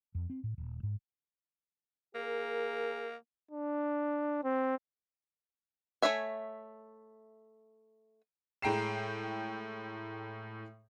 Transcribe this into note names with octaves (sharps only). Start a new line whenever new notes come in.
F2
C4
A2
D#1
G#2
A#3 G#4 A#4
D4
C4
A3 F#4 C#5 E5 G#5
A2 G#3 G5 A#5 C7 E7